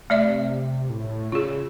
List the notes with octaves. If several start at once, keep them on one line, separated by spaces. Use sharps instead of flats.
C3 A3 D5 E5
A2
C#3 F4 G#4